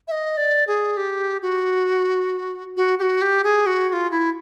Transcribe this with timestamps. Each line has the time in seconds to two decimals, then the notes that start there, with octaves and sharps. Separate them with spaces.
0.08 E5
0.12 D#5
0.37 D5
0.67 G#4
0.97 G4
1.42 F#4
2.77 F#4
2.99 G4
3.02 F#4
3.22 G4
3.44 G#4
3.66 F#4
3.89 F#4
3.93 F4
4.11 E4